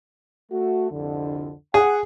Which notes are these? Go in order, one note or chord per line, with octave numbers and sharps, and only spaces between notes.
A3 F#4
C2 F2 D3
G#4 F#5